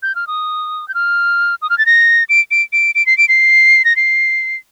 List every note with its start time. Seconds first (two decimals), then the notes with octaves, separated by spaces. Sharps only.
0.03 G6
0.15 F6
0.27 D#6
0.88 G6
0.94 F6
1.62 D#6
1.70 F6
1.78 A6
1.86 A#6
2.29 D7
2.51 D7
2.73 D7
2.95 D7
3.06 C7
3.18 D7
3.29 C7
3.85 A#6
3.96 C7